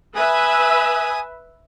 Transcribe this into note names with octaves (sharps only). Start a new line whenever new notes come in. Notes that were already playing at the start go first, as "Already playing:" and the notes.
B4 E5 G#5 D#6